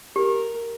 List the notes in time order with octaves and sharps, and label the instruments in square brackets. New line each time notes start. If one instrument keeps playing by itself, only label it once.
[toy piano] G4 [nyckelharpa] A#4